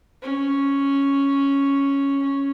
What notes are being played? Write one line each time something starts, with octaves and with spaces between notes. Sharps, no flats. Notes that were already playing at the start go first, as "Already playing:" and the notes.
C#4
C#4